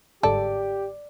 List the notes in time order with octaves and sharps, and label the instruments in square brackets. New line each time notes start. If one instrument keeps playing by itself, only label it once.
[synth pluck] G1 G#2 D3 [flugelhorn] G4 [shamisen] A4 [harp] D5